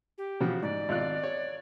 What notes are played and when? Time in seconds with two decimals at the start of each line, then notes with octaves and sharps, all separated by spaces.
0.18 G4
0.40 C#3 F3 F#4
0.62 G#2 D5
0.89 G#1 F4 F#6
1.24 C#5